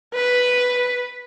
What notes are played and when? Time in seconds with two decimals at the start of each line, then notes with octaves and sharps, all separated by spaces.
0.14 B4